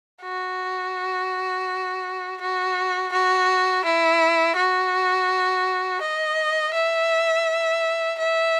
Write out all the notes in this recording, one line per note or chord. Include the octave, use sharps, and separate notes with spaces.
F#4
F#4
F#4
E4
F#4
D#5
E5
E5